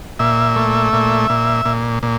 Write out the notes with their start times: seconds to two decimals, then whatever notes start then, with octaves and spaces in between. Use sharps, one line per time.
0.19 A#2 E5
0.56 A3
0.93 A#2
1.30 A#2
1.65 A#2
2.03 A#2